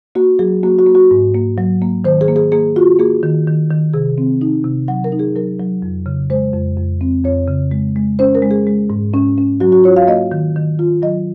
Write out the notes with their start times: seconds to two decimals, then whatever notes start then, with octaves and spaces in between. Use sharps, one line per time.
0.15 A#3 F#4
0.39 F#3 G#4
0.63 A#3 F#4
0.79 F#4
0.87 A#3
0.95 F#4
1.11 G#2
1.35 A#3
1.58 F#3
1.82 A#3
2.05 D#3 C5
2.21 G#4
2.28 A#3
2.36 G#4
2.52 A#3 G#4
2.76 F4 F#4
2.99 A#3 G#4
3.23 D#3
3.47 D#3
3.71 D#3
3.94 C3 G#4
4.18 C4
4.41 D#4
4.64 C3
4.88 F#3 F#5
5.04 A#4
5.12 D#4
5.19 G#4
5.36 F#3 A#4
5.59 F#3
5.82 F2
6.06 C#3
6.30 G#3 C5
6.54 F2
6.77 F2
7.01 C4
7.25 F2 C#5
7.48 C#3
7.71 G#3
7.96 G#3
8.19 C#4 C5
8.35 A#4
8.42 G#3
8.51 G#4
8.67 G#3
8.90 G#2
9.14 C#4
9.38 C#4
9.60 F#3 F#4
9.72 F#4
9.84 F4 C#5
9.96 F5
10.08 A#3 D#5
10.32 D#3
10.56 D#3
10.79 F4
11.02 F#3 D#5